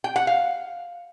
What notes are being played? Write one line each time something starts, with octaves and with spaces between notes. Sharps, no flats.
G5
F#5
F5